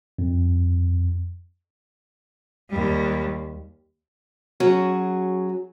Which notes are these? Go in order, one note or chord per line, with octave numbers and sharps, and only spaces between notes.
F2
D#2 G3
F#3 C#4 F#4 G#4